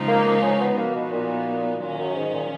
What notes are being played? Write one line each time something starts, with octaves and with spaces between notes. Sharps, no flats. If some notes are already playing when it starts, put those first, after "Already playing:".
Already playing: C#3 F3 G#3 D#4
A#3
A#3
C#4
B3
F3 A#3 B3 D#4 F#4
B2
A#2
A#2 D#3 F#3 C#4
F#2
G#2
A#2